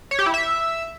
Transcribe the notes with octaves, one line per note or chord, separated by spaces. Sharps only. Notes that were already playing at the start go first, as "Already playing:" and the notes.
C#5
G4
E4
E5